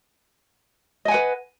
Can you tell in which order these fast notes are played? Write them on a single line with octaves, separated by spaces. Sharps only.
D#5 G#5 F#5 B4